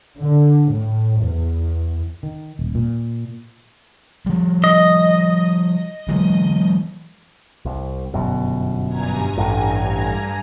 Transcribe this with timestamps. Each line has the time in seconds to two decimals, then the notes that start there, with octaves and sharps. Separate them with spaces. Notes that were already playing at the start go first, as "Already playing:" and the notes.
0.19 D3
0.70 A2
1.21 E2
2.23 D#3
2.59 D#1
2.75 A#2
4.26 F3 G3
4.64 D#5
6.08 E3 F#3 G#3
7.65 C2
8.14 G1 F#2 B2
8.87 G2 G#5 A#5
9.38 A1 A2